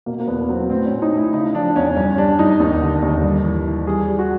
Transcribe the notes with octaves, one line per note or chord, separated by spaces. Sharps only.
B2 A#3
A#3
E2 B3
F#3 C4
A2 C4
C#4
A2
D#4
A2
E4
C#3 D#4
F3 D4
E2 C#4
G2 C#4
G3 D4
G2 D#4
D#2
D3
D#2
G2
E3
E3
G3 G#4
G3
F#4